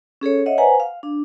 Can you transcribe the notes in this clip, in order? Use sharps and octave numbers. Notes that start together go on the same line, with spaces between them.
C#4 G#4 A4 C#5
C#5 D#5 E5 F#5
B4 C5 F#5 G#5 A#5
F5
D4